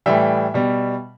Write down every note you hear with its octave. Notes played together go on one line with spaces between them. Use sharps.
A2 E3 G3 E5
B2 G3